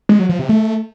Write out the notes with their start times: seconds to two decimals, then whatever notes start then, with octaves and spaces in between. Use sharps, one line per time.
0.09 G#3
0.19 F#3
0.29 F3
0.39 C3
0.49 A3